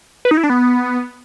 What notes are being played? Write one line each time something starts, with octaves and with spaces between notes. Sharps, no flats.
B4
D#4
E4
D4
B3